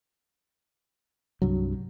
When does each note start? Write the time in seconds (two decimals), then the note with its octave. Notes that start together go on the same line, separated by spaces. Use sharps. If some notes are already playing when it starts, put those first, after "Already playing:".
1.42 C2 G2 F#3